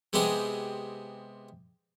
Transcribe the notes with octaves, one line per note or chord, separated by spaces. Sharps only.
C3 G#3 B3 C4 G4 G#4